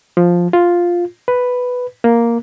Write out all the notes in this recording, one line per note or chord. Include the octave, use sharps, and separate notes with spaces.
F3
F4
B4
A#3